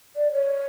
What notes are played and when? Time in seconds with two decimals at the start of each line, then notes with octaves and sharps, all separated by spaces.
0.16 D5
0.32 C#5